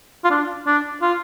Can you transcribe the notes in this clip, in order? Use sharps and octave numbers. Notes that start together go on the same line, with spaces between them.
F4
D4
D4
F4